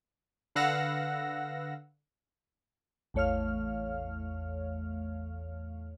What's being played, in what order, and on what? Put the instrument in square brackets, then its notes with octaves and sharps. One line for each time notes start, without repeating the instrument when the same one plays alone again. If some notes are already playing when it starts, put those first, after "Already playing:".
[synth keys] D3 B4 F5 F#5 E6 A#6
A1 E2 A3 C#5 F5 F6